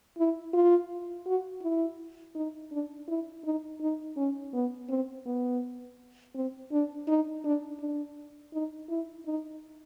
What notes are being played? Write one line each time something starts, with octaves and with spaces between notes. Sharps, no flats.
E4
F4
F#4
E4
D#4
D4
E4
D#4
D#4
C#4
B3
C4
B3
C4
D4
D#4
D4
D4
D#4
E4
D#4